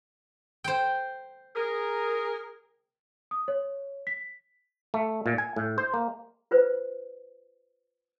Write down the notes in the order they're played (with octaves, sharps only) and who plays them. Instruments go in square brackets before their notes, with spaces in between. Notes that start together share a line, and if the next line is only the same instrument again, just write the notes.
[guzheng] C5 G5
[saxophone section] G#4 A#4
[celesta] D#6
C#5
B6
[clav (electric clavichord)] A3
A#2
G#5
A2
C5
A#3
[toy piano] F4 B4 C5